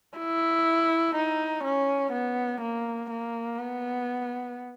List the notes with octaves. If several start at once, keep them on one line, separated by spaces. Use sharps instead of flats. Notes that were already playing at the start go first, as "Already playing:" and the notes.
E4
D#4
C#4
B3
A#3
A#3
B3